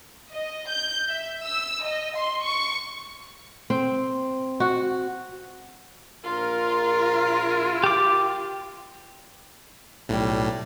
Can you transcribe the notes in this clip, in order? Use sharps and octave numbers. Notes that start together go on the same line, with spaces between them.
D#5
G6
E5
E6
D#5
C6
C#6
C4
F#4
A#1 F4 A#4
G4 D6
B1 A2 G3